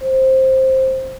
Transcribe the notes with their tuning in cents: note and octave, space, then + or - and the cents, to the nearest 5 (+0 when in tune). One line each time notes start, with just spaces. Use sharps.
C5 +10